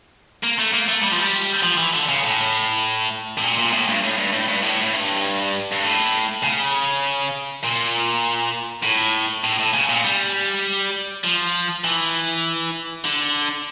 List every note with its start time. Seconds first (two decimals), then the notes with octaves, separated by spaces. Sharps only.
0.43 A#3
0.58 A3
0.73 A#3
0.88 A3
1.02 G3
1.11 F3
1.20 G3
1.63 F3
1.78 E3
1.93 D3
2.09 C#3
2.23 A2
3.38 A2
3.44 A#2
3.58 A#2
3.73 A2
3.88 G2
4.04 A2
4.18 G2
4.33 A2
4.48 G2
4.63 A2
4.82 A2
4.93 G2
5.72 G2
5.83 A2
6.43 C#3
7.64 A#2
8.83 A2
9.44 A2
9.59 A2
9.73 C#3
9.89 A#2
10.05 G3
11.24 F3
11.84 E3
13.05 D3